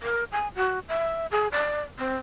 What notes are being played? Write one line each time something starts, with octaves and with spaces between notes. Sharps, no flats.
A#4
G#5
F#4
E5
G#4
D5
C4